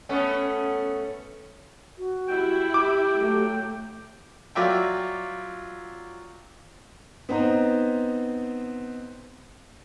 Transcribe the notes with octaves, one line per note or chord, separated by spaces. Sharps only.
A3 B3 C#4
F#4
G3 E4 G5
G4 D6
F#3 A3
F#3 F4 D5 E5 G5
B3 C4 D#4 C5 A#5